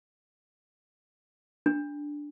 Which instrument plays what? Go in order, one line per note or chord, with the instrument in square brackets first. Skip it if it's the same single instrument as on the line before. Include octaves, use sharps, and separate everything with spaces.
[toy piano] D4